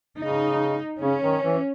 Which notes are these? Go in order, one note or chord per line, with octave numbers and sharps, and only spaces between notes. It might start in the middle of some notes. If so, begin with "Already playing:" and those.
C#3 D#4
C#3 C#4
D#3
E3